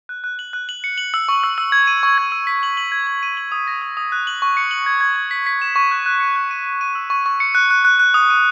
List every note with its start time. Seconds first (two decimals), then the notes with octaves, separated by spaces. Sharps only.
0.09 F#6
0.24 F#6
0.39 F#7
0.53 F#6
0.69 F#7
0.84 C#7
0.98 F#7
1.14 E6
1.28 C#6
1.43 E6
1.58 E6
1.72 G#6
1.87 D#7
2.03 C#6
2.18 G#6
2.32 E6
2.47 B6
2.63 F#7
2.77 F#7
2.92 G#6
3.07 G#6
3.23 D#7
3.37 F#7
3.52 D#6
3.67 A#6
3.82 D#6
3.97 D#6
4.12 F#6
4.27 F#7
4.42 C#6
4.57 C#7
4.71 F#7
4.86 G#6
5.01 G#6
5.16 G#6
5.31 B6
5.47 B6
5.62 E7
5.76 C#6
5.91 F#6
6.06 F#6
6.20 C#7
6.36 F#6
6.51 D#7
6.65 D#7
6.81 D#7
6.95 E6
7.10 C#6
7.26 C#6
7.40 C#7
7.55 F#6
7.71 F#6
7.85 F#6
7.99 F#6
8.14 D#6
8.30 D#7